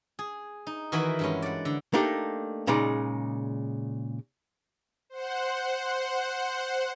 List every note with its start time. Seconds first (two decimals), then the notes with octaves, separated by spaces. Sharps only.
0.19 G#4
0.67 D#4
0.92 D#3 E3 F#4 A#4 G#5 B5
1.19 G2 G#3 C#4
1.42 D5 F#5
1.65 D3
1.93 A3 A#3 D4 D#4 G4
2.67 A#2 C#3 G#3 D#4 D5
5.10 C5 F#5